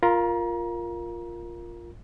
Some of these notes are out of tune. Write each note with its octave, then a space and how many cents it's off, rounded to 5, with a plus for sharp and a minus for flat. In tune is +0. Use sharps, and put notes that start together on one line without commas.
F4 +0 A#4 +0 A#5 +30